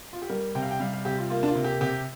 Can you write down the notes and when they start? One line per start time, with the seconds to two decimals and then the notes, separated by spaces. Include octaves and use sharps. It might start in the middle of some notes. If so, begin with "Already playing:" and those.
0.13 F4
0.22 G4
0.29 G3 A#4
0.55 C3 G5
0.62 F5
0.71 G5
0.80 G3 F5
0.93 F5
1.05 C3 G4
1.18 F4
1.30 A#3 F4
1.43 D4
1.48 F4
1.55 C3
1.64 G4
1.81 C3 G4